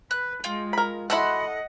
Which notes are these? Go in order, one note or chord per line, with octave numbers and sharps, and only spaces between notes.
B4 F#6
G#3 F4 G5
A#4 B5
E4 F#4 A4 D#5 F#5 B5 C6